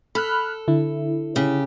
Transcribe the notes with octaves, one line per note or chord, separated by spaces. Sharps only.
A4 B5 F6 F#6
D3 E4
C#3 G4